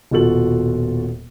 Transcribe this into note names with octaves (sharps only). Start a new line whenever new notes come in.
D#1 B2 F4 F#4 A4 F#7